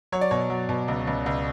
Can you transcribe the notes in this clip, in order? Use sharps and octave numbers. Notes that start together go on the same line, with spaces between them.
F#3 C#5
D5
B2 C#5
F#3
B2
C#2
C#2
C#2